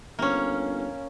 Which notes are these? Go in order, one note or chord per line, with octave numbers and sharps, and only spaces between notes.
G1 A#3 C#4